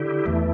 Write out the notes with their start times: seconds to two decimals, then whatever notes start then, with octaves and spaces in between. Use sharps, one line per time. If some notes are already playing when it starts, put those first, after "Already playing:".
Already playing: D3 E4 G4
0.26 E2 E3 A3